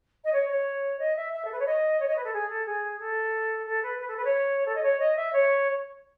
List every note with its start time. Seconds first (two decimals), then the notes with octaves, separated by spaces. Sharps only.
0.24 D#5
0.33 C#5
0.49 C#5
0.99 D#5
1.16 E5
1.33 E5
1.45 A4
1.52 B4
1.59 C#5
1.66 D#5
2.00 C#5
2.08 D#5
2.16 B4
2.24 A4
2.33 G#4
2.49 A4
2.66 G#4
2.99 A4
3.67 A4
3.83 B4
3.99 B4
4.08 A4
4.17 B4
4.24 C#5
4.66 A4
4.75 D#5
4.83 C#5
4.99 D#5
5.16 E5
5.33 C#5